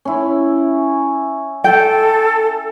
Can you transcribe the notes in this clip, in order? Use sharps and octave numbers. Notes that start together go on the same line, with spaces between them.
C#4 E4
A4 G5